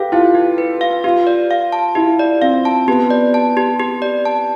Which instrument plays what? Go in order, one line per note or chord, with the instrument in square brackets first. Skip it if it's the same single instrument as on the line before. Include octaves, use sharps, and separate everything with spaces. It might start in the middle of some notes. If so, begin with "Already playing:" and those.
Already playing: [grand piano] G4 A4 B4 [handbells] F5
[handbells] E4 [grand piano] F4
[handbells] G4
B4
F5
[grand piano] F4 [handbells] G4
[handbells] D5
F5
A5
[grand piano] E4 [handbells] G4
[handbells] D5
[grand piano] C4 [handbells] F5
[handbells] A5
[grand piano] B3 [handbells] G4
[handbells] D5
A5
G4
G4
D5
A5